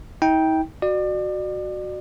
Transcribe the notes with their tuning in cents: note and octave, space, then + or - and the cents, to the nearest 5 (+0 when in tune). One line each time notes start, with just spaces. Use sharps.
D#4 +45 G5 +0
F#4 +0 D5 +35